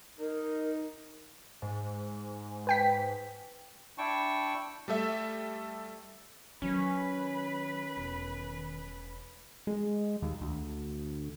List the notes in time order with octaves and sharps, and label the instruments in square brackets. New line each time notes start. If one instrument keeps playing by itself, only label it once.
[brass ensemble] D#4 [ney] A#4
[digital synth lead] G#2
[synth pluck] B4 G5 B6
[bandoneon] D4 E4 G5 A5 C#6
[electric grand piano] G3 A3 A4 E5
[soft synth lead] D#3 [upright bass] F#3 [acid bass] C#4 [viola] B4 B5
[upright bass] E1
[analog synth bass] G#3
D#2
D2